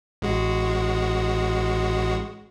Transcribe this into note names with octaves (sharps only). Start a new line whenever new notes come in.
A1 G#3 F#4